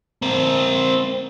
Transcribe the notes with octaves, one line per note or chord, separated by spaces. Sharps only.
C4 A#4